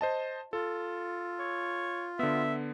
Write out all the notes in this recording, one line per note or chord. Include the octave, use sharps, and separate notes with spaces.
C5 D#5 A5
F4 A4
C#5
D3 B3 E5